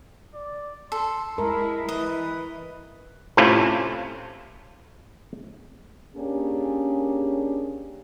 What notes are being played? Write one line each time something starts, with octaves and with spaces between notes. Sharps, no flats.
D5
A4 C6
G#3 E4 A#4 B5
E3 B4 D#5
A2 C3 C4 C#4 E4 F4
A#3 C#4 D4 G4 G#4